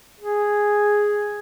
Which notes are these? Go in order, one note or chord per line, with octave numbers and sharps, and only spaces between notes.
G#4